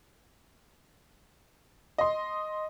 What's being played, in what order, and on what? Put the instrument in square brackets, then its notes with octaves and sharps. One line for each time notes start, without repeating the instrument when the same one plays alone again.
[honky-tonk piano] D#5 C6